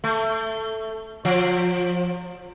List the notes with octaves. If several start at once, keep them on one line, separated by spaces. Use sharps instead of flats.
A3
F3